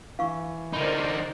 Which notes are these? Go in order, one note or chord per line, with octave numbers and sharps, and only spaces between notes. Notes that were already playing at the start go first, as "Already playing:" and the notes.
E3 F5 C#6
D3 D#4 A#4 C5 D5 B5 C6